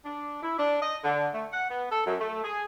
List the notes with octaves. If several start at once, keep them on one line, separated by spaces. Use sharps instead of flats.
D4
E4
D4
D#5
D3
A3
F#5
B3
A4
F#2
A3
G#4